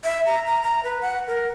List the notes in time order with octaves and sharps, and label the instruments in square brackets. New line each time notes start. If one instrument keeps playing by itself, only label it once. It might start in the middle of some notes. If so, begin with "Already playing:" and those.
[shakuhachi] E5
A#5
A#5
A#5
B4
F#5
A#4